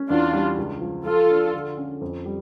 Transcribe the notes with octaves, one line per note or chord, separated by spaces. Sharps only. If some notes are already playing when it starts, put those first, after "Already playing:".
Already playing: C#4
E2 D4 F4
G3
C#2
F3
F3 F4 A4
D4
D3
C#4
F2
G3